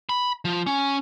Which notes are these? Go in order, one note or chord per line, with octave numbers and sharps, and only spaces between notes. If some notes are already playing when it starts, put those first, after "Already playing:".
B5
F3
C#4